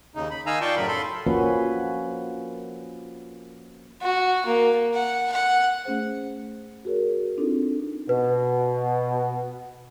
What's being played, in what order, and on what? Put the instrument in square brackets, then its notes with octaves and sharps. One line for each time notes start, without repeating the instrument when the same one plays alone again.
[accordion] D#2 C#3 D#4
B5
D#3 D#4 F5 G#5 A#5 E6
F4 D5 G5 A5 C6 C#6
F#2 A2 C#3 F#3 A#4 B5
A4 B5 C6
[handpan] F3 A#3 C#4 F#4 B4
[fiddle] F#4
A#3
F#5
F#5
[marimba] A3 C#4 G#4 C5
F#4 G#4 A#4 C#5
C4 D4 D#4 F4 A4
[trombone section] B2 [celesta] B4